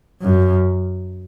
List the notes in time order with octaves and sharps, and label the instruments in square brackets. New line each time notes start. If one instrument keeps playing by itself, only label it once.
[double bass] F#2